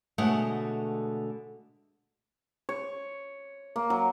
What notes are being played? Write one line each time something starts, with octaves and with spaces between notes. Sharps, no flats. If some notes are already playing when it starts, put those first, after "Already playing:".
B2 D3 G#3 A3 C#5 F#5
C#5
A#3
F#3